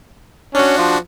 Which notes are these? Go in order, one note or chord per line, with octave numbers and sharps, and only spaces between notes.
C#4 D4 F#4
F3